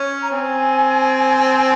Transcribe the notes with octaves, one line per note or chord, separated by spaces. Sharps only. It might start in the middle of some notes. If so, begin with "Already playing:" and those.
Already playing: C#4
A#5
C4 G#5